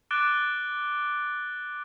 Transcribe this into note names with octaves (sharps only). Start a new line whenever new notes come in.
D6 F#6 A6 D7 G7